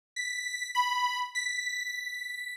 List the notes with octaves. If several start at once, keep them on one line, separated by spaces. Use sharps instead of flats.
B6
B5
B6
B6